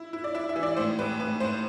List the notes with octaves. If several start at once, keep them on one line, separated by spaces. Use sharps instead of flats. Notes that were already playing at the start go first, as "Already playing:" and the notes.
Already playing: E4
E4
D5
E4 E5
E5
E3
D5
A2 C5
A2 B4
A2 B4
A2 C5